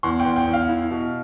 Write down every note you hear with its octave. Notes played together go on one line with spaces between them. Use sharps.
E2 C6
G5
E2
G5
E2
F5
E4
B2